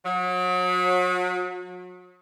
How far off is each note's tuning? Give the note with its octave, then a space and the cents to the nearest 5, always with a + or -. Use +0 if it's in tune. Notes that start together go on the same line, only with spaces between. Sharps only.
F#3 -35